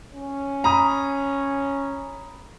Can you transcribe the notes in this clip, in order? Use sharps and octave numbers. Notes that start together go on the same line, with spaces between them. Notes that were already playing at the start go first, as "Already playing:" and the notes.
C#4
A#5 B5 D#6